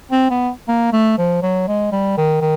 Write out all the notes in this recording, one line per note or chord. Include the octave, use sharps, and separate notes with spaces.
C4
B3
A#3
A3
F3
F#3
G#3
G3
D#3
D#3